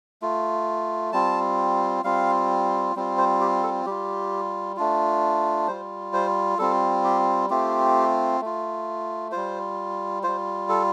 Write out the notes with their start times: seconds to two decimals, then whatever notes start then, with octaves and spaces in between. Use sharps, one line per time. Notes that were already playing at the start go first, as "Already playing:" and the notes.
0.22 A3 F4
1.13 G3 C4 F4 A5
2.04 G3 C4 F4 F5
2.96 G3 C4 F4
3.18 C5
3.41 G4
3.63 A4
3.86 G3 F4 G4
4.76 A3 D4 F4
5.68 G3 F4 C5
6.13 C5
6.59 G3 C4 F4 A4
7.04 G4
7.50 A3 C4 F4 G4
8.41 A3 F4
9.32 G3 F4 C5
10.23 G3 F4 C5
10.69 A4